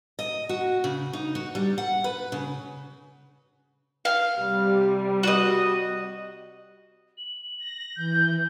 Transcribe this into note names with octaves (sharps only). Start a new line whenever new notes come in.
D#5
F#4
C#3
D#4
F#4
G3
F#5
B4
C#3
F5
C3 G3
F#4 D#5
F#7
A#6
E3 G6